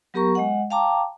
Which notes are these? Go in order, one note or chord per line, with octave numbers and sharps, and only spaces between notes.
F#3 B3 G4 A#4 A#5 C#6
G#3 D#5 F#5
F5 G5 A5 A#5 D6